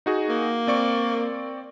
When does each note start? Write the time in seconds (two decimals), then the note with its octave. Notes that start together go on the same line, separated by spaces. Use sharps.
0.06 D#4 F#4 G#4
0.29 A#3
0.67 C4 D5 C#6